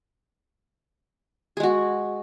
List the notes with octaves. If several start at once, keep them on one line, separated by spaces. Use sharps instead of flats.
G#3 F#4 G#4